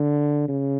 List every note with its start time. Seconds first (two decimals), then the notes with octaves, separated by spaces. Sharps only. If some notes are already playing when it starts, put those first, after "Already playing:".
Already playing: D3
0.48 C#3